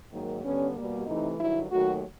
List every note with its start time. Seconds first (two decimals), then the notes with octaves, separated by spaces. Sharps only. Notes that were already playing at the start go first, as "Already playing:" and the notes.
0.11 G#2 D#3 F#3 A#3
0.43 G2 D3 G3 B3 C#4
0.75 B2 G3 A#3
1.06 C3 E3 A3 D#4
1.38 G2 D#3 F#3 E4
1.70 D#2 D#3 F#3 A3 F#4